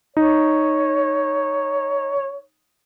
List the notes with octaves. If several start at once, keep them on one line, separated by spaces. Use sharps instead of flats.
D#4 C#5